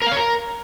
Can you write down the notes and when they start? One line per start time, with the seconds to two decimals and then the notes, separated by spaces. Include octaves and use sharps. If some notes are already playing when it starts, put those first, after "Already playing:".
0.02 A#4
0.07 F5
0.12 C#5
0.17 A#4